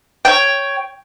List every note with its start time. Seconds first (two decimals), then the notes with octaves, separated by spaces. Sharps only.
0.25 C#5 G5